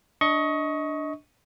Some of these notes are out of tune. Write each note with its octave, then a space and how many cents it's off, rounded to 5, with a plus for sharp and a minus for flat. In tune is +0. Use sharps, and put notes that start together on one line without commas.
D4 +5 D#5 +25 C#6 +0